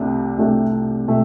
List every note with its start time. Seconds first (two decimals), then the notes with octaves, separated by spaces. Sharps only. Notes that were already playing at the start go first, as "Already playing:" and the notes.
Already playing: C2 C3 A3 D4 G4
0.37 C2 C3 A3 D4 G4
1.08 C3 A3